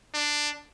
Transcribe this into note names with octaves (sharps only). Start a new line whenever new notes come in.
D4